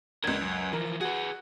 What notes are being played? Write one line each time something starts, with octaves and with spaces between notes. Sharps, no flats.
C#2 D4 A#4 G#6
F#2
E3 F3 A#4
F#4 G#4 B4